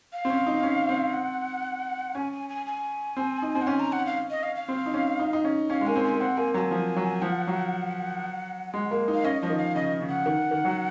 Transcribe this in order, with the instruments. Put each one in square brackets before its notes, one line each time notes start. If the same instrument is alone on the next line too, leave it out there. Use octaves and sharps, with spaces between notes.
[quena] F5
[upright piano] C4
C#4
D#4
C#4
C4
[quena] F#5
[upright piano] C#4 [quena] G#5
[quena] G#5
G#5
G#5
[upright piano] C4
D#4
C4
[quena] F#5
[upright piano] C#4 [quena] G#5
[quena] A#5
F#5
F5
D#5
F5
F5
[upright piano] C4
D#4
C#4
D#4
D#4
C#4
[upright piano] C#4 [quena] F5
[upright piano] G#3
[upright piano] A#3 [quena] G#5
[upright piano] C4
[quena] G#5
[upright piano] A#3
[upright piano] C4 [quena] F#5
[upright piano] A#3 [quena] G#5
[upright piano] F#3 [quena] G#5 A#5
[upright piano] F3
F#3
[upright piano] F3 [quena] F#5
[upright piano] F#3
G#3
A#3
D#4
[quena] F5
[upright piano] C#4 [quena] D#5
[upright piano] F3 [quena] D#5
[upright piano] D#3
[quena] F5
[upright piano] C#3 [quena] D#5
[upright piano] C#3
[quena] F#5
[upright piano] D#3
D#3
F#3